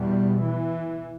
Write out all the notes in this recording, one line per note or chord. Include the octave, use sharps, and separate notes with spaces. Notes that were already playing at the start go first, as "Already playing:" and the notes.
Already playing: E2 B2 G3
E3